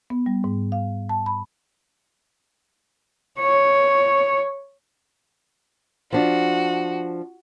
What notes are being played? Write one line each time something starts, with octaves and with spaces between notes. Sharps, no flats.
B3
G3
G#2
F5
A5
B5
C#5
F3 D4 F#4